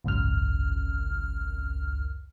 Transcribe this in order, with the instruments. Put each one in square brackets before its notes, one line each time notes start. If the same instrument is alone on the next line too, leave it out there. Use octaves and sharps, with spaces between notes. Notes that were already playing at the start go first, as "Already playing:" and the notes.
[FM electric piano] G#1 C#2 F#2 F6